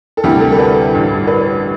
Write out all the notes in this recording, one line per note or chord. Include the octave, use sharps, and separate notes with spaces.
A4
D2 C3 E3 G3 G4
A4
A4
B4
A1 G2 D3
B4